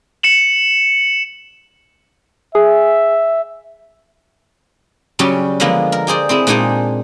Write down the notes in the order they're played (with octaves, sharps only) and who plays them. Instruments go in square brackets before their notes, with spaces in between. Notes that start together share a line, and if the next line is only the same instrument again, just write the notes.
[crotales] C#7 E7 F#7
[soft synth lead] G#4 [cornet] E5
[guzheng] C#3 F#3 G3 C#4 G4
D3 F3 G#3 A#3 B3
A#4
G4 G#4 C5 D5
C4 E4 G#4
A#2 G#3 D4 D#4 G#4 G5